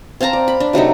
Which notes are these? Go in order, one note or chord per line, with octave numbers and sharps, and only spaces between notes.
C4 F5 A5 A#5
D5
B5
D4
C3 F#3 A3 D#4